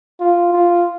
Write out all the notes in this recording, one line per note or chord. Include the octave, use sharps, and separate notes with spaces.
F4
F4